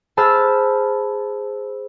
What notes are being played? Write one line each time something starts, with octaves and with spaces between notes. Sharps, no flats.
G#4 C5 A5 B5 E6 F6